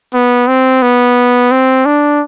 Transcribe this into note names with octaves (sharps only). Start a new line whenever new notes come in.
B3
C4
B3
C4
D4